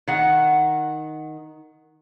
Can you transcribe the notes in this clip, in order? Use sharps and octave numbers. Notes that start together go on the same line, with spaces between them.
D#3 F#5